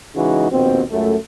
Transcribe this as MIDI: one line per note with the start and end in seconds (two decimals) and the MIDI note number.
0.16 0.47 49
0.16 0.47 52
0.16 0.47 56
0.16 0.47 63
0.16 0.47 66
0.51 0.82 34
0.51 0.82 39
0.51 0.82 47
0.51 0.82 60
0.91 1.16 37
0.91 1.16 42
0.91 1.16 57